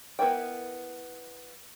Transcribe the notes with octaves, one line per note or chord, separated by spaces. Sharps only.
B3 E4 A#4 D5 G5